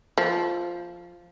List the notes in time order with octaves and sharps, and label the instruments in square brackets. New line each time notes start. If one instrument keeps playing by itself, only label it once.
[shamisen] F3